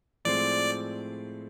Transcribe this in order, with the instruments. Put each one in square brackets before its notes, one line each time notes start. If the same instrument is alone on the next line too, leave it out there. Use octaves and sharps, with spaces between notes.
[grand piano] A2 F3 G#3 C4 [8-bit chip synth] D5